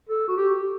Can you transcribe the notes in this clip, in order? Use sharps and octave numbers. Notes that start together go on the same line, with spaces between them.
A4
F#4
G4